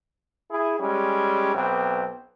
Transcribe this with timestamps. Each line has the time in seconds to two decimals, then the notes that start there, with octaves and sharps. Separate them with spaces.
0.51 E4 G#4
0.80 G3 G#3 C#4
1.55 B1 B3 C4